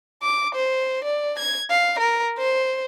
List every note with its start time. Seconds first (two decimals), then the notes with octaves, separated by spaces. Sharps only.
0.23 D6
0.55 C5
1.04 D5
1.39 G#6
1.70 F5
1.99 A#4
2.38 C5